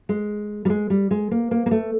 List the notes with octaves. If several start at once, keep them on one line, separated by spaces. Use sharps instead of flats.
G#3
G3
G#3
G3
G#3
A#3
A#3
A#3
A3